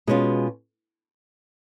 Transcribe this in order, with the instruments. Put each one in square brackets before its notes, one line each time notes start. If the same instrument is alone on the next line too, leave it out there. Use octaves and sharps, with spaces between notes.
[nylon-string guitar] B2 G#3 C#4 F4